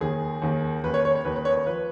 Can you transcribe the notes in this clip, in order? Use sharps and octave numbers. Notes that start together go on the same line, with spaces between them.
D#2 D#3 G#4
D#2 D#3
D#2 D#3 B4
C#5
C#5
C#5
D#2 D#3 B4
B4
C#5
C#5
F3 B4